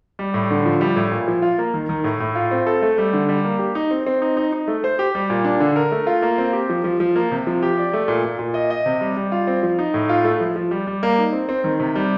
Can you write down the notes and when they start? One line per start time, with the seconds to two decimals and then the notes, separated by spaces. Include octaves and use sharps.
0.19 G3
0.34 A2
0.51 D3
0.66 F3
0.81 G3
0.96 A2
1.12 A#2
1.28 F3
1.42 F4
1.59 A#3
1.74 D#3
1.89 D#3
2.04 A2
2.20 A2
2.35 F4
2.51 C4
2.67 A4
2.82 A3
2.98 G3
3.13 D3
3.29 G3
3.44 A#3
3.59 G4
3.75 D#4
3.91 C4
4.06 C4
4.22 D#4
4.37 D#4
4.52 D#4
4.68 A3
4.84 C5
4.99 G4
5.15 G3
5.30 A#2
5.45 D4
5.60 D3
5.76 A#4
5.91 A3
6.07 F4
6.22 A#3
6.38 C4
6.53 G4
6.69 F3
6.84 F3
7.00 F3
7.16 A#3
7.31 C3
7.47 F3
7.62 G4
7.78 D5
7.93 A3
8.08 A#2
8.24 A#2
8.39 A#2
8.54 D#5
8.70 D#5
8.86 C3
9.01 G3
9.17 G3
9.32 F4
9.47 C4
9.63 F3
9.79 D#4
9.94 A2
10.09 F4
10.24 A3
10.40 F3
10.56 F3
10.71 G3
10.87 G3
11.03 A#3
11.18 D#4
11.33 C4
11.49 C4
11.64 D#3
11.80 C3
11.95 G3